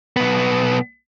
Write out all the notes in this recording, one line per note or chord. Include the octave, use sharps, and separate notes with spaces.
B1 B3